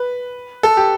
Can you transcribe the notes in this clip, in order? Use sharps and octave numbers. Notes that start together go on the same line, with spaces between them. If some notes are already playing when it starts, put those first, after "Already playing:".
Already playing: B4
A4
G4